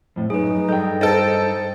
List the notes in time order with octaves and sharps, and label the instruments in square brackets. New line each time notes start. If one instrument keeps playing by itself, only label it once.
[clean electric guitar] F2 A2
[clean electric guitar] F#2 [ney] D#4 [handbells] G#4 B4
[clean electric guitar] G2 G5 [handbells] A4 D#5 G6
[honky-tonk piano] D#4 A4 [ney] C5 [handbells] A6 D7